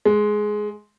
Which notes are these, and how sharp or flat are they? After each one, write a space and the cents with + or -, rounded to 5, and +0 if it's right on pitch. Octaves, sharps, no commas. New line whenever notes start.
G#3 +10